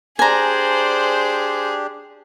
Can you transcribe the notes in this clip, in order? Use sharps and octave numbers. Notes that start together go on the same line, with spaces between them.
D4 G4 G#4 C5 D5 G#5 A#5